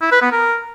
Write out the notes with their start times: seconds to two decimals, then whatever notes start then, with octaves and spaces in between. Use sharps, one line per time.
0.02 E4
0.12 B4
0.22 B3
0.32 A#4